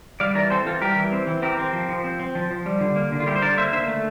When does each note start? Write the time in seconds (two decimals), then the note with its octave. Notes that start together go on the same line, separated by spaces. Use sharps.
0.20 G3 D5 F5
0.35 E3 A#4 D5
0.50 C4 A4 C5
0.66 E3 F4 A4
0.82 G3 G4 A#4
0.96 E3
1.12 C4
1.27 E3
1.42 C4 G4 A#4
1.59 C4
1.73 F3
1.89 F3
2.04 C4
2.20 C4
2.35 F3
2.51 F3
2.66 G3
2.80 D3
2.96 A#3
3.12 D3
3.20 F4
3.26 G3 E4 G4
3.36 C5
3.42 D3 A#4 D5
3.57 A#3 C5 E5
3.73 D3 C5 E5
3.88 A3